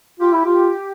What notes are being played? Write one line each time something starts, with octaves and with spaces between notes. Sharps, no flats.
F4 G4
E4
F4